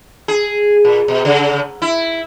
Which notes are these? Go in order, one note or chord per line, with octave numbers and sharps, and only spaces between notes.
G#4
A#2
B2
C#3
E4